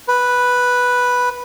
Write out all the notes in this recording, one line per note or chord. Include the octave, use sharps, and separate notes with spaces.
B4